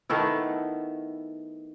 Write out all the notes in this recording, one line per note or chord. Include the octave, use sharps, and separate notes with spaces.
D#3 A3 B3 E4